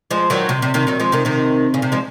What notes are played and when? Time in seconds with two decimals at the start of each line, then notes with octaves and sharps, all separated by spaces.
0.11 F3 G#3
0.30 D#3 F#3
0.49 C3
0.62 C3
0.74 C3 D#3
0.87 D#3 F#3
1.00 F3 G#3
1.12 C3 D#3
1.25 C3 D#3
1.74 C#3
1.82 C3
1.92 F3 G#3